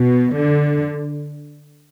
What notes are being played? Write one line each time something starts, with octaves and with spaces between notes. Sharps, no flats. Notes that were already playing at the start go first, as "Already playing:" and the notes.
Already playing: B2
D3